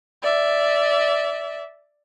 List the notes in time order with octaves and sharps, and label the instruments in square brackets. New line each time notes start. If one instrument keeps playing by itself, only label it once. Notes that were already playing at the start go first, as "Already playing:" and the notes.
[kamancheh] D5 E5